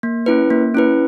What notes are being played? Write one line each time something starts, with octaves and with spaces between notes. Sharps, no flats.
A#3
C#4 E4 B4
A#3
C#4 E4 B4